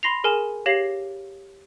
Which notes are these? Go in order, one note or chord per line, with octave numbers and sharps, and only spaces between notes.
B5 C6 A#6 C7 F7
G#4 A#4 G#5 E7
G4 C#5 F5 A#6 C7 F#7